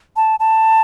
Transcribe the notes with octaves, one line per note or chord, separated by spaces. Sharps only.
A5
A5